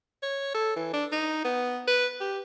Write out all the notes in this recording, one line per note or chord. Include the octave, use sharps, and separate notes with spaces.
C#5
A4
E3
D4
D#4
B3
B4
G4